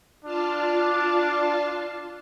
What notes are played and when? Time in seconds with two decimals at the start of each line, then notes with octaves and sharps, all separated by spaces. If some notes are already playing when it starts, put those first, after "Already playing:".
0.24 D4 F4 F5 A5